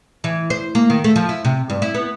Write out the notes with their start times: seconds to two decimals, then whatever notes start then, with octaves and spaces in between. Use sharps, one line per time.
0.24 E3
0.50 C5
0.75 A#3
0.90 D#3
1.04 A3
1.16 F3
1.29 E4
1.45 C3
1.70 G2
1.82 E4
1.94 B3